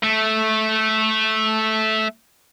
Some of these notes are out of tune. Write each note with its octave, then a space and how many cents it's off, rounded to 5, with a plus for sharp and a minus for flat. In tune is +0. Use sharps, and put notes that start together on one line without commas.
A3 -10